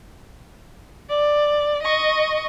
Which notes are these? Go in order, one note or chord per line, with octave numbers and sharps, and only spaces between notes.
D5
D#5 C#6